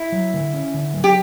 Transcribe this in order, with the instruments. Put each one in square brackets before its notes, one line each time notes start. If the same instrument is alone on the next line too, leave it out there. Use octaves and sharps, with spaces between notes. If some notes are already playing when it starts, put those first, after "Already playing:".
Already playing: [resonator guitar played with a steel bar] E4
[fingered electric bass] F#3
D3
C#4
D3
F#3
[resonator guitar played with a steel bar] G4